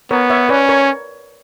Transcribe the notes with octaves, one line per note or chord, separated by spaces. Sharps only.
B3 A#4 C#5
C#5 E5
C#4 B4 D5
A#4 C#5